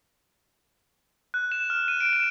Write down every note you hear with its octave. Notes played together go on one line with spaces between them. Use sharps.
F#6
E7
F6
D#7
D7
E7